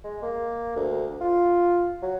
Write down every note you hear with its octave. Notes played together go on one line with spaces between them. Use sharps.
G#3
A#3
D2
F4
F#3